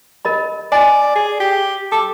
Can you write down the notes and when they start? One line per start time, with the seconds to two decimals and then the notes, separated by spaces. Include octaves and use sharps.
0.25 A#4 D#5 B5
0.72 D5 D#5 G#5
1.16 G#4
1.40 G4
1.92 A4 D6